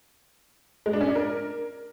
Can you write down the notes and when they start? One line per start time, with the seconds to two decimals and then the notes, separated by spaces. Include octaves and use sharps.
0.86 G#3
0.93 D4
1.01 C#4
1.08 D4
1.15 A#4